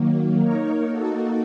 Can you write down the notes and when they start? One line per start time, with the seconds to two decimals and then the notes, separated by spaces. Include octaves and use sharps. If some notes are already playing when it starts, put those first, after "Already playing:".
Already playing: D#3 F#3 A#3
0.39 A#3 D#4 A#4 C#5
0.89 A#3 D#4 F#4 A4